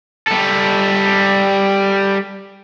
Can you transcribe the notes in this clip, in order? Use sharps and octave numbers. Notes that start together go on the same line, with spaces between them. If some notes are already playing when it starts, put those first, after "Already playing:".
G3 A4